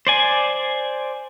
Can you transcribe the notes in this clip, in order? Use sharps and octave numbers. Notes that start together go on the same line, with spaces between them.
C5 D5 G#5